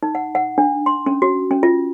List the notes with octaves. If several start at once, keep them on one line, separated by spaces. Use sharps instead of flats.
D#4
F#5
F#5
D4
C6
C#4
F#4
C#4
F4